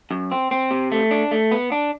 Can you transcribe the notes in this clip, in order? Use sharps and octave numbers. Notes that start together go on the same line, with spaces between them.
F#2
C4
C4
C3
A3
D4
A3
B3
D4